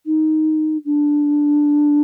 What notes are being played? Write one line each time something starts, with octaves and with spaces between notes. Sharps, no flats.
D#4
D4